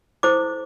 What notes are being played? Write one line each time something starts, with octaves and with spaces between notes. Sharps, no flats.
E4 A4 C5 D6